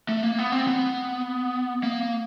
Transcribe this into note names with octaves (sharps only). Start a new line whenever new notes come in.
A3
A#3
B3
C4
B3
A#3